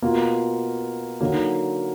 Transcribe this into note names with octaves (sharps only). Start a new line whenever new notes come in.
B2 A#3 F4
D3 F#3 A#3 D#4 F#4